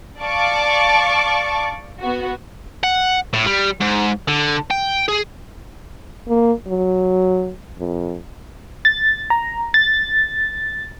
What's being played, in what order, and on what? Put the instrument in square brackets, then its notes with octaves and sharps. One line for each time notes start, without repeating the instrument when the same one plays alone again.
[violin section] D5 F5 A5 C#6 D6
B3 F#4
[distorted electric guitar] F#5
A2
G3
G#2
D3
G5
G#4
[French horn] A#3
F#3
F2
[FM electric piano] A6
A#5
A6